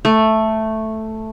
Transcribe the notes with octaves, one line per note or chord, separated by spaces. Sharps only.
A3